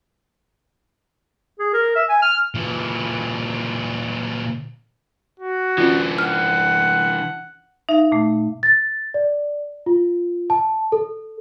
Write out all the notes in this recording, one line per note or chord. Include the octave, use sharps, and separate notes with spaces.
G#4
A#4
E5
G#5
F6
A#2 E3
F#4
E3 C#4 D4 F4
F#5 F6
D#4 E5 F5
A#2 A3
A6
D5
F4
A5
A4